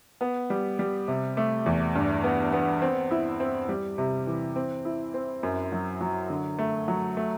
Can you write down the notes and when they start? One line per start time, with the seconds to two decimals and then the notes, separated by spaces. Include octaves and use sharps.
0.21 B3
0.50 G3
0.79 G3
1.08 C3
1.37 A3
1.66 E2
1.95 G2
2.24 B3
2.53 B3
2.82 C4
3.11 E4
3.40 C4
3.69 G3
3.98 C3
4.27 E3
4.56 C4
4.85 E4
5.14 C4
5.43 F#2
5.72 F#3
6.01 F#3
6.30 D3
6.59 A3
6.88 F#3
7.17 A3